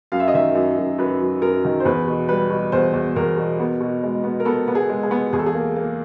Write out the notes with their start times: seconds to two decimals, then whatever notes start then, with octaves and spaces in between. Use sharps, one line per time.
0.12 F#2 F5
0.20 E5
0.28 D#5
0.34 D#3 E5
0.55 F#2
0.77 F#2
0.98 F#2 B4
1.20 F#3
1.42 F#2 A#4
1.64 D#3
1.80 C5
1.85 E2 B4
2.08 B2
2.29 G3 B4
2.50 B2
2.72 E2 C5
2.93 E2
3.16 E2 A#4
3.37 B2
3.60 B3
3.81 B2
4.03 G#3
4.24 B3
4.40 A#4
4.45 B3 A4
4.68 B3
4.75 G#4
4.90 G#3
5.03 G#4
5.11 B3
5.32 E2 G#4
5.39 A4
5.46 G#4
5.55 A#3
5.76 A#3